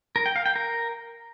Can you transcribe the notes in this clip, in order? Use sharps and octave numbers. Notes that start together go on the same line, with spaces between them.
A#4
G5
F5
G5
A#4